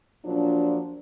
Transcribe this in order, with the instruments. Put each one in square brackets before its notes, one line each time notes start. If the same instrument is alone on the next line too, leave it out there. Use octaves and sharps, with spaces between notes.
[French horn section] A#2 F3 F#3 D4